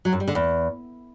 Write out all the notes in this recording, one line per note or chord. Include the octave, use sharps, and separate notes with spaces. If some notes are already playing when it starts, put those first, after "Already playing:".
F#3
F#2
G3
D3
E2